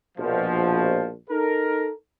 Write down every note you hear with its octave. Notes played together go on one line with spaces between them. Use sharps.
A#1 B2 F3
D#4 A4 A#4